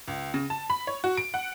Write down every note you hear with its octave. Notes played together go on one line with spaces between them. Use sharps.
C#2
C#3
A5
B5
C#5
F#4
D7
F#5